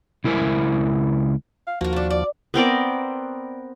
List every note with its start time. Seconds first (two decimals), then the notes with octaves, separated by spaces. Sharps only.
0.24 C#2 E4 A#4 C5 E5 G#5
1.67 F5
1.81 D#2 F3 A#3 F#4 A#4
1.93 A3 D4
2.10 D5
2.54 B3 C4 A#4 D5